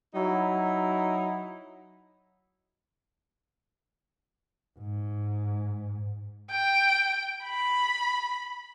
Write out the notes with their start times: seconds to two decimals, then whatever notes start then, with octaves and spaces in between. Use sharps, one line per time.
0.13 F#3 D#4 E4
4.79 G#2
6.51 G5
7.45 B5